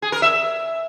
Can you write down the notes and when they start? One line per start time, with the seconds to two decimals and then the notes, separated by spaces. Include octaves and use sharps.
0.02 G#4
0.12 A#4
0.22 E5